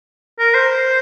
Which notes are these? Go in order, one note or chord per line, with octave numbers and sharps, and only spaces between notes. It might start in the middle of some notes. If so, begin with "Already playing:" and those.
A#4
C5